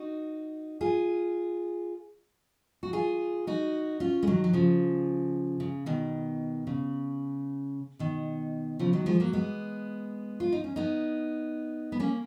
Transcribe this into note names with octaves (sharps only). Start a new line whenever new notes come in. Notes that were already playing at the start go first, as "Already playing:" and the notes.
Already playing: D#4 F#4
F4 G#4
F#4
F4 G#4
D#4 F#4
C#4 F4
G#3
D#3 F#3
F#3
C#3 F3
C#3
B2 D#3
C#3
B2 D#3
C#3 F3
D#3 F#3
F3 G#3
F#3 A#3
G#3 B3
F4
D#4
C#4
B3 D#4
B3
A#3 C#4